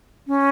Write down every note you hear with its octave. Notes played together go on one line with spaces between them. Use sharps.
C#4